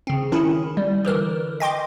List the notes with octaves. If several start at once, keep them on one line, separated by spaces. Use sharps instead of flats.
C#3 C4
D#3 C#4 E4
G3
D3 E3 A#4
D#5 G5 C6 D6